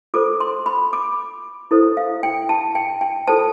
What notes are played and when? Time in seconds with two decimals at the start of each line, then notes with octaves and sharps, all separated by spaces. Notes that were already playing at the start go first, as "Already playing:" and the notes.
0.14 F4 A4 C5 D6
0.40 C6
0.66 B5
0.93 D6
1.71 E4 A4 C5
1.97 F5
2.23 G5
2.49 A5
2.75 G5
3.01 G5
3.28 F4 A4 C5 A5